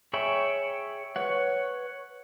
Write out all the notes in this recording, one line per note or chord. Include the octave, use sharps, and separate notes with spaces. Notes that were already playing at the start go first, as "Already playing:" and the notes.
G#4 C#5 E5 G5 B5
B4 C#5 F#5